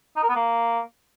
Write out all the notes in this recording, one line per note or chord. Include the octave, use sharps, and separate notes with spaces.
D#4
A#4
B3
A#3